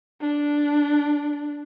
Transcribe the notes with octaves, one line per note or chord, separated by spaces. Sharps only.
D4